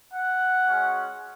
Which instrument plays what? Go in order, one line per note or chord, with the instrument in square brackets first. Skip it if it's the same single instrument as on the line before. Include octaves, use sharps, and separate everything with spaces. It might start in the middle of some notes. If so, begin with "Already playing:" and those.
[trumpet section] F#5
G#3 C#4 F#4